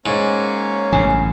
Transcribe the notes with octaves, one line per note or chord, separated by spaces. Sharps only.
G#2 A#3 C#4 C#5
A1 G2 C#3 G#5